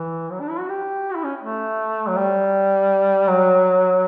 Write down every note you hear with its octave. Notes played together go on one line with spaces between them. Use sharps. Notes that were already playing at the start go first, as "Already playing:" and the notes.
Already playing: E3
F#3
D4
E4
F#4
G4
F#4
E4
C#4
A3
F#3
G3
F#3